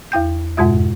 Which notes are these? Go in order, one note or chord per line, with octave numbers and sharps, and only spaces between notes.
E2 E4 G5 G6
F2 G#2 B2 G#3 F4 E5